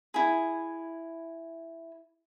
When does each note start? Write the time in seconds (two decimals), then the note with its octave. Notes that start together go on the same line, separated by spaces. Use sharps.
0.14 E4 G#4